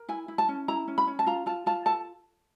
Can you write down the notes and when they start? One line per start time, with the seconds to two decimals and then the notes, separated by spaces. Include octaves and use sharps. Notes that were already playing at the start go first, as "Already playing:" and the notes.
Already playing: A#4
0.09 E4 G#5
0.28 E4
0.38 A5
0.49 C#4
0.68 E4 A#5
0.88 C#4
0.98 B5
1.07 C#4
1.19 A5
1.26 F4 A#5
1.46 F4 A5
1.66 F4 A5
1.86 A4 A5